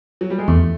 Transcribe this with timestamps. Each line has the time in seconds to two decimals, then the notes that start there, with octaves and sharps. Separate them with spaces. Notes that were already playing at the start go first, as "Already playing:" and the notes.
0.21 F#3
0.30 G3
0.38 G#3
0.48 E2 A3